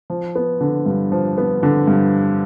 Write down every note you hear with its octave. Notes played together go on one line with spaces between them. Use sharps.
F3
B3
D3
G2
F3
B3
D3
G2